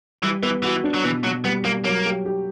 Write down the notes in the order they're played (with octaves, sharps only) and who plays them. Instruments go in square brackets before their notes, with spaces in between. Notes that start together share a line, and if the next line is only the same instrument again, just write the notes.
[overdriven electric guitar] E3 [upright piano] G3
[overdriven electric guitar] E3 [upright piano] B3
[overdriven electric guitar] E3 [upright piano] F#4
[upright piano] D4
[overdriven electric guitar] F#3
[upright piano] B2 [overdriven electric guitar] E3
[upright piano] B2 [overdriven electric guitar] F#3
[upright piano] G3 [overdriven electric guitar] B3
[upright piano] G3 [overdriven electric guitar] A#3
[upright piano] F#3 [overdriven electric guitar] A#3
[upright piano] G4
G4